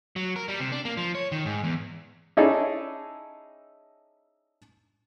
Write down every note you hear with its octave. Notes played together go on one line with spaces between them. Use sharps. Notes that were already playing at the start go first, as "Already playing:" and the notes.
F#3
A#4
G3
C3
D4
A#3
F3
C#5
D#3
G#2
E2
C#4 D#4 E4 G#4 A4 D5